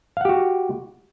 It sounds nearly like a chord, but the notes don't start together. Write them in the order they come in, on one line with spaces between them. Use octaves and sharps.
F5 F#5 G4 F#4